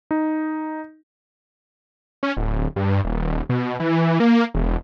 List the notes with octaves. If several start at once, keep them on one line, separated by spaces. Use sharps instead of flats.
D#4
C#4
D1
G2
D#1
B2
E3
A#3
E1